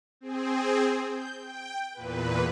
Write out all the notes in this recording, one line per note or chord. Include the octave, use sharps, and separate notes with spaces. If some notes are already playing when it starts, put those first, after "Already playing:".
C4 G#4
G6
G5
E2 A#2 B4